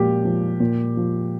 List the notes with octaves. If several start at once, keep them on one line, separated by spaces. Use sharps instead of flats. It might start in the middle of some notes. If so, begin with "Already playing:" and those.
Already playing: A#2 F3 G4
F3
A#2
F3